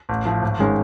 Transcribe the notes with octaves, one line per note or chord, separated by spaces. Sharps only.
A1
A2 F3
G#1
D#3 G#3 C#4